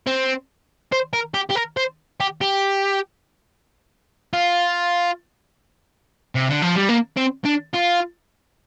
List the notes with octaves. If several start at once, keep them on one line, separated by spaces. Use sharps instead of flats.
C4
C5
A#4
G4
G4
A#4
C5
G4
G4
F4
C3
D3
F3
G3
A#3
C4
D4
F4